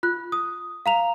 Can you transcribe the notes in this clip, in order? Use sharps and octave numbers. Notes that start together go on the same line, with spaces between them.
F4 F#6
D#6
F5 A#5 F7